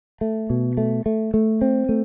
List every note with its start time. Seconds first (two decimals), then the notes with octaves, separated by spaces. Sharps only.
0.21 A3
0.50 B2
0.77 A3
1.06 A3
1.34 A3
1.61 C4
1.89 A3